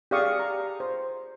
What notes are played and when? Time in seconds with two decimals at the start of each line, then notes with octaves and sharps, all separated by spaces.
0.11 G4 G#4 D5 F5 C#6 D#6
0.40 A#5
0.80 C5